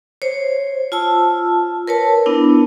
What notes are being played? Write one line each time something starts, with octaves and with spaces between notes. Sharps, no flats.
C5 C#5
F4 A5 E6
A#4 B4 C#5 A5
B3 D4 E4